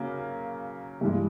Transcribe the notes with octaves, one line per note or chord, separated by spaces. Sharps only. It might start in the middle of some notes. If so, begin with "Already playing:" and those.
Already playing: C#3 F#3 A#3
G2 E3 G#3